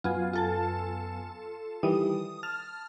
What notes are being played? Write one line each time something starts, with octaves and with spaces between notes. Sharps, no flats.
F#2 B3 F4 G#5
F4 A4 A5
D#3 E3 G3 D#6
A5 F6